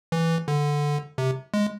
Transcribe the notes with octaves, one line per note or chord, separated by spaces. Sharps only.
E3
D3
C3
G#3